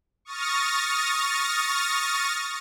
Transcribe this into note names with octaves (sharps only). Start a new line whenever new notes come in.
C#6 D#6 F6 A6 A#6